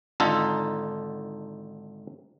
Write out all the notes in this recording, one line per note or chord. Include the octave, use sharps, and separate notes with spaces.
G#1 D3 D#4 F4 A4 A#5